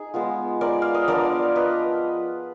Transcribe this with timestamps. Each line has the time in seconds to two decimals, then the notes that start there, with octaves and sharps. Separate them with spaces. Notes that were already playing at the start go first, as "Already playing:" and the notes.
Already playing: D#4 G#4
0.14 G#3 B3 F4
0.61 A#4 D5
0.82 F5
0.94 D#5
1.08 F3 B3 D4 F4 A#4 D5
1.56 B4 D#5